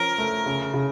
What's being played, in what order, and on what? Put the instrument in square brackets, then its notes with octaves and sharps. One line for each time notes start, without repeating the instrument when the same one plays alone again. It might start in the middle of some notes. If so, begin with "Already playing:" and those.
Already playing: [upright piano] F3 C#4 [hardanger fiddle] A#4
[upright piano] A3
C#3
C#3